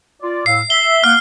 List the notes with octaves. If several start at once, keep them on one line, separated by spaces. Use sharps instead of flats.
F4 D5
A2 F5 E6 C7
E5 G7
A#3 F#5 F6